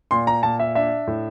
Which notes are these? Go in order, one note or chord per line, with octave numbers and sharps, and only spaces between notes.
A#2 C6
A#5
A#2 A5
E5
D4 E5
A2